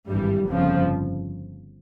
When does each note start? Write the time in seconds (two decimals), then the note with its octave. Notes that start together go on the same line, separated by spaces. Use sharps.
0.08 G#1 G2 E3 G3
0.48 G1 F2 C#3 F3